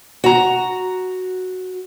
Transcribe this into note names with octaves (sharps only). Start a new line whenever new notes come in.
F#4 A#5